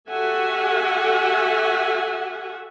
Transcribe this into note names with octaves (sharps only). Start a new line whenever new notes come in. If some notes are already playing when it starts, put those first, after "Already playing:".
F#4 G4 A4 E5 F#5 G#5